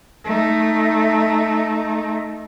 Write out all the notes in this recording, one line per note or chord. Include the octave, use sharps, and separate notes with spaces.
A3 D#4